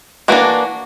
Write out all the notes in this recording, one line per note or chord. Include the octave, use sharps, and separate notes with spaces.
E3 A#3 D4 F#4